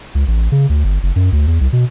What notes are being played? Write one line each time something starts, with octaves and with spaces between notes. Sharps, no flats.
C#2
A1
C#3
D2
G1
F#1
F#2
D2
E2
C2
B2